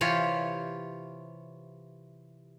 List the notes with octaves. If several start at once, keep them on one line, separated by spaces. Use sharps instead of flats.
C3 E3 F4 G4 C#5